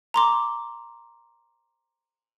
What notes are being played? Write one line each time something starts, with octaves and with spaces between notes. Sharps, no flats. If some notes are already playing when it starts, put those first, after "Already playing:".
A#5 C6 D6